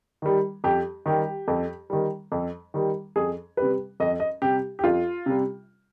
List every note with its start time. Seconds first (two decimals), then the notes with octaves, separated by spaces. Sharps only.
0.22 D#3 G3
0.64 F2 G4
1.06 D#3 G3 G4
1.48 F2
1.90 D#3 G3
2.32 F2
2.74 D#3 G3
3.16 F2 G#4
3.57 C3 G3 B4
4.00 F2 D#5
4.20 D#5
4.42 C3 G3 G4
4.79 G4
4.84 F2 F4
5.26 C3 G3